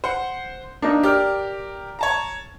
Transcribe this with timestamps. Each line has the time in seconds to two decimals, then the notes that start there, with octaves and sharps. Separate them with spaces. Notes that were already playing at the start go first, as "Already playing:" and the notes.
0.04 C5 F#5
0.82 A#3 D4 D#4
1.03 G4 A#4 D5 F6
1.99 C#5 A5 A#5